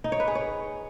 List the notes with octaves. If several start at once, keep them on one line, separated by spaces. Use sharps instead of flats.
D#4
C#5
B4
G#4
C#5